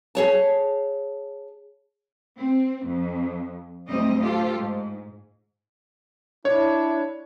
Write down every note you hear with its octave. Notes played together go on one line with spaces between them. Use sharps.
G#4 C#5 A5
C4
F2
D2 A2 F#3 G3 C4 D#5
F4 G4 A4 C5
G#2
D4 E4 C#5